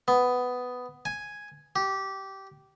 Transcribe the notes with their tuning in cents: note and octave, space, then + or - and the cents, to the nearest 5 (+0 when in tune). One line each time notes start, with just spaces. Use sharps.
B3 +10
G#5 +0
G4 -15